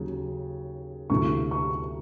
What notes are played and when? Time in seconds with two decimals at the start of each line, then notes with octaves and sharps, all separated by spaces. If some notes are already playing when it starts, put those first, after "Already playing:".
Already playing: D#2 C#3 F#3
1.10 D2 C3 E3 C#6
1.51 C#6